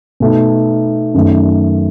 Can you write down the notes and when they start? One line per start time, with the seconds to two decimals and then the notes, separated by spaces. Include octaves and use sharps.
0.20 B2 A3 D#4
1.14 F#2 D#3 A3